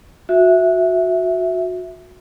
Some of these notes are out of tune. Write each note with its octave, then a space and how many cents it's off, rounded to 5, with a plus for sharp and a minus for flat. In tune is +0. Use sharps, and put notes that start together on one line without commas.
F#4 -20 E5 +0